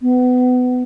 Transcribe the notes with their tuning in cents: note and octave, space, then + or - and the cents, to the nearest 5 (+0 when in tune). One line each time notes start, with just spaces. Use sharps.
B3 +25